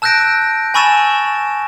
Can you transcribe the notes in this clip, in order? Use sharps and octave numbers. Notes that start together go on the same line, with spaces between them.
A5 E6 F#6 G6 A#6 D7
G#5 B5 C#6 E6 A6 E7